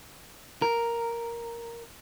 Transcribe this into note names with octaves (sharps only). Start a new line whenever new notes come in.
A#4